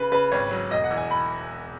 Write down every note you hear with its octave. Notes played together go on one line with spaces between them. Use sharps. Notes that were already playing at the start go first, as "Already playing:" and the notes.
Already playing: C#3 B4
C#3 B4
G#1 C#5
F#3
E1 D#5
F#5
E2
G#5
B5